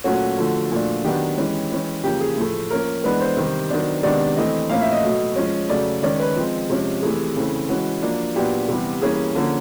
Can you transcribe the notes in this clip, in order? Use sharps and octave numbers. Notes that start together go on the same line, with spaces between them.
A#2 F#3 A3 C#4 F#4
D3 F3 A3
A#2 F3 A3 D4
D#3 F#3 B3 D4 G4
E3 G#3 C#4
E3 G#3 C#4
C#3 F3 A#3 G4
G#4
A2 F3 A3
F3 A#3 C#4 A#4
E3 G#3 B3 D4 B4
C5
C3 D#3 G3
D#3 F#3 B3 D4
C3 D#3 G#3 B3 D4 D5
E3 A3 C4 D#5
A2 F3 A#3 C#4 F5
E5
D#5
B2 F#3 A3
F3 G#3 C#4
C#3 F#3 A3 D5
D#3 G#3 C#4 D5
B4
F3 G#3 C4
C3 F3 G#3 C#4
C3 E3 A3 G#4
C#3 E3 A3 C4
E3 G#3 C#4 F#4
F3 A#3 D4
A#2 F#3 B3 D4 G4
C3 E3 G3 B3
E3 G3 A#3 C#4 G#4
D3 F3 A#3 C#4